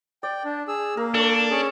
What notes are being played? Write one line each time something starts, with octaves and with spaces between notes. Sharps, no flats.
D5 G5
D4
G#4 E6
A#3 A#4
D4 A4 C#6
C#4 G#4